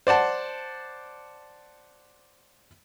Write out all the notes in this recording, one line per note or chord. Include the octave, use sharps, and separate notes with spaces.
C5 D5 F#5 A5